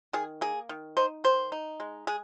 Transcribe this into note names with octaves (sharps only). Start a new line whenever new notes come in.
D#3 G#4
A#3 G#4
D#3
D#4 C5
D#3 C5
D#4
G#3
G#3 G#4